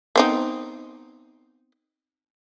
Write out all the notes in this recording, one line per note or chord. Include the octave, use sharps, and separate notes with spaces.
B3 C4 D#4